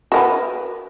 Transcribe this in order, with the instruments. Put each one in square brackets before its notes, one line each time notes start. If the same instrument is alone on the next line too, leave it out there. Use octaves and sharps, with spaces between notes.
[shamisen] F#4 A#4 B4